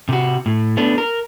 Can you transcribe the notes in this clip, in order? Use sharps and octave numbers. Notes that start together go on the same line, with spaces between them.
C3 F#4
A2
A3 B3 D4
A#4